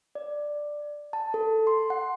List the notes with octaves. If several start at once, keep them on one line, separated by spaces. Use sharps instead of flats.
D5
A5
A4
C6
F#5